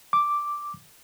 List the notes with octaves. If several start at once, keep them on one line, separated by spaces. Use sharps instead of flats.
D6